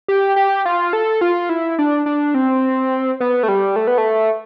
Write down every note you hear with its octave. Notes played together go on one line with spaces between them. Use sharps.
G4
G4
F4
A4
F4
E4
D4
D4
C4
B3
A3
G3
A3
B3
A3